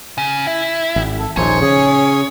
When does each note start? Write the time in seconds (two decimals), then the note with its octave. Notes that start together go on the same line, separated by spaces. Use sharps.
0.18 C#3
0.47 E4
0.96 G#1
1.19 A4
1.37 D#1 A#1 D#4 C5 C#5 G#5
1.62 C#3 C#4 G#4